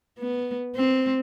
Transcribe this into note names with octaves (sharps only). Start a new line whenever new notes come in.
B3
C4